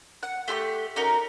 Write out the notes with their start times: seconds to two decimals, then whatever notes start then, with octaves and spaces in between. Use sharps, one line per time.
0.23 F#5
0.48 A3 G4 C6 F#6
0.96 C#4 D#4 F#4 A#4